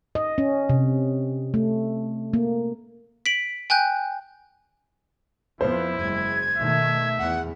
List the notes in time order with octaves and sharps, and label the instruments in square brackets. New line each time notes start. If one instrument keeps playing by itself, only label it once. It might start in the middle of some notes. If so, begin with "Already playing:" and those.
[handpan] D#5
C#4
C3
A3
A#3
[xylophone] B6 D7 F#7
G5 G#5 F#6 G6
[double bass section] F2 F3 B3 [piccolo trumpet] E4 [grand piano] C5
[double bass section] F#1 E2 G#3 [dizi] G#6
[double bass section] B2 D#3 A3 [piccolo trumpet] E5
[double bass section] E2 [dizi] F#5